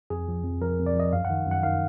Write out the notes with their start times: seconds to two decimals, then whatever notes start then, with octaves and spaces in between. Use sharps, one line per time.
0.10 F2 G#4
0.28 F3
0.44 F2
0.62 F3 A#4
0.79 F2
0.86 D5
0.95 F3 D#5
1.13 F#2 F5
1.25 F#5
1.30 D#3
1.47 F#2 F#5
1.63 D#3 F5